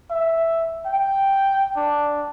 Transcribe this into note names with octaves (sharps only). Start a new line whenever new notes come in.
E5
G5
D4